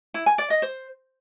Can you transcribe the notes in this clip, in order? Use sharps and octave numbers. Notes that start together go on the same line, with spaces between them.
E4
G#5
D5
D#5
C5